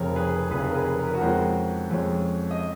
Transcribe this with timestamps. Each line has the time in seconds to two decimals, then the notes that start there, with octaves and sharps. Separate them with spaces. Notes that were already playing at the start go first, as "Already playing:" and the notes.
Already playing: F1 F2 C#3 A#4 C#5
0.16 G#4 B4
0.50 F1 F2 C#3 G#4 B4
0.64 A#4
0.74 G#4 B4
0.97 A#4
1.07 B4
1.14 F#4 A#4
1.21 F2 F3 G#3 C#4
1.91 F2 F3 G#3 C#4
2.51 D#5